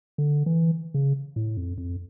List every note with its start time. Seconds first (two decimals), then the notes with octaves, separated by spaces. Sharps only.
0.18 D3
0.46 E3
0.94 C#3
1.36 A2
1.57 F2
1.78 F2